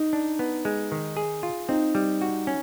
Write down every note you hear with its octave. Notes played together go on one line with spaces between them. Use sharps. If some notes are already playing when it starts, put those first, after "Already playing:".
Already playing: D#4
D4
B3
G#3
D#3
G#4
F4
C4 D#4
G3
F#4
C#4